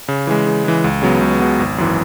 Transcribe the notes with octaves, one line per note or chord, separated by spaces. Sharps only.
C#3
E3 G#3
C#3
E3 G#3
C#2
C#3 F#3 B3
C#2
C#3 F#3 B3
G#1
F#2 E3